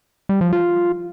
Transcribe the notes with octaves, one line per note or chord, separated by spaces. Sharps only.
G3
F3
F4